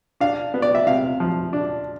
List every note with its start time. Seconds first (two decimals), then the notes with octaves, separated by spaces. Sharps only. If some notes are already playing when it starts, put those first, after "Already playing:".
0.20 D4 F5
0.54 B3
0.62 D5
0.75 E5
0.87 C3 F5
1.20 F3
1.53 D4